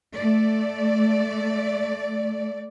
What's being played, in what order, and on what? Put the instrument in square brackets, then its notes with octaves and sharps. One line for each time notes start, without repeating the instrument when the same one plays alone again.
[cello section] A3 D5